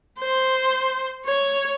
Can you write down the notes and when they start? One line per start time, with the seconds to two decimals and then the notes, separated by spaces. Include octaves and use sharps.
0.19 C5
1.26 C#5